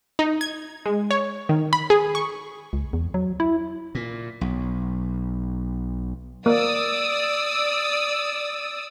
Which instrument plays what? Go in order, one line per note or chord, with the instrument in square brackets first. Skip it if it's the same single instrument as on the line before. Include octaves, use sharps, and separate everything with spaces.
[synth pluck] D#4
G#6
G#3
C#5
D#3
B5
G#4
C#6
[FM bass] C#2
E2
F#3
E4
[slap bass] A#2
B1
[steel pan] A#3 [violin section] D5 D#6 E6